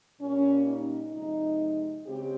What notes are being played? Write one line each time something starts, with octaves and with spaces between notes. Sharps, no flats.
A#2 G3 A#3 C#4
D#4
C3 F3 G#3 D#4
C#3 G#3 C4 G4